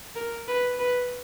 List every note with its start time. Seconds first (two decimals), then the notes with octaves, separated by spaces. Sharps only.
0.16 A#4
0.48 B4
0.79 B4